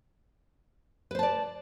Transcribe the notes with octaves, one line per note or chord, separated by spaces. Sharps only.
B4 C5 D5 A5